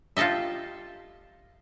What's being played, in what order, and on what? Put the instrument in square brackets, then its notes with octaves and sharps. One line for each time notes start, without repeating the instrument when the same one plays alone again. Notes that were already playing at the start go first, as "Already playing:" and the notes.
[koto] F4 G4 A4 D#5 E5